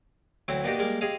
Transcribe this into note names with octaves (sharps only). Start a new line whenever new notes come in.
D2 F#3 C4 E4
A#3 B3 D4 D#4 F#4 G4
G3 G#3 A#3 A#4
C3 G#4 D#5 F5